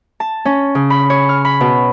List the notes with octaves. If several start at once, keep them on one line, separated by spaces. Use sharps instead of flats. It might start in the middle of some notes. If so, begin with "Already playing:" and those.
A5
C#4
C#3
B5
C#5
F6
B5
B2